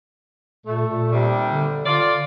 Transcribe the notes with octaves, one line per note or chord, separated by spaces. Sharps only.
A#2 A3
A#2
D#2 C3 G3
D3
D3 F4 D5